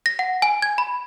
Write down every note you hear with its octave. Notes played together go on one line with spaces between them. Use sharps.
A#6
F#5
G#5
G#6
B5